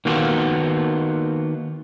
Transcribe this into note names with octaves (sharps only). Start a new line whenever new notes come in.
D#3 A#3 B3 F4 F#4 A4